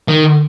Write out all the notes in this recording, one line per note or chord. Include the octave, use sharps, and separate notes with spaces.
D#3